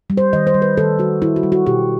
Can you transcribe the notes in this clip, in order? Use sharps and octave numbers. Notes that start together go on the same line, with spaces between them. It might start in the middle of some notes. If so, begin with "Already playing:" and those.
G3
C5
D#3 D#5
C5
G3
B4
D#3 A4
G3 F#4
D#3 E4
F#4
G3
F#4
B2 G4